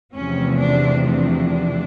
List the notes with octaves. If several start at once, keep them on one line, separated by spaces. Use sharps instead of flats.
E2 C3 F3 A3 C#4
D4
D4